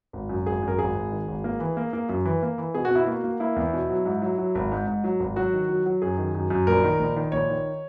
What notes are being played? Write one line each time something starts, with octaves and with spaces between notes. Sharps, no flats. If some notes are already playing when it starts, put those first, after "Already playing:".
G#1
F#2
G#1 G#4
F#2 A#4
G#1 G#4
G#1
D#3
G#1
A#3
E3
A#3
A#3
F#2
E3
A#3
E3
B2 G#4
F#4
B2 E4
A#3 F#4
A#3
A#3 E4
E2
B2
F#3
G#2
F#3
F#3
G#1
G#2
G#2
F#3
G#1
F#3 F#4
D#3
F#3
F#3
F#2 G#4
D#3
F#2
F#2
A#1 A#4
D#3
A#1
D#3
A#1 C#5
D#3